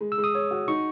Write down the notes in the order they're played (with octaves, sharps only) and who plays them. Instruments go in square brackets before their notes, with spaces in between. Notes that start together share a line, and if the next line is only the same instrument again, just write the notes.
[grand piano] G#3
[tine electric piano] E6
[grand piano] G#3
[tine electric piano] D#6
[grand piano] C#5
F#4
[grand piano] D#4 [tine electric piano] C#6